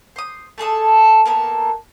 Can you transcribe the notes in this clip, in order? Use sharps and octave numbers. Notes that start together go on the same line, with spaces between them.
C5 D#6
A3 G#4 A4 D#6
A#3 B3 A4 A#4